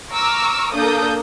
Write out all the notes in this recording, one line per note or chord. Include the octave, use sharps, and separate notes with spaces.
A#5 C#6 D6 E6 F6
A#3 D4 A4 D#6 G6